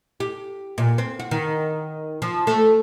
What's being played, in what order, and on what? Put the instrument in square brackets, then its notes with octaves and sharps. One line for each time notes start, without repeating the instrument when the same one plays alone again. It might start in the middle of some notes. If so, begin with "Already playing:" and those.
[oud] G4
A#2
C4
F#4
D#3
F3
A3